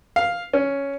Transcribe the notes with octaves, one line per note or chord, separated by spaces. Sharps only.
F5
C#4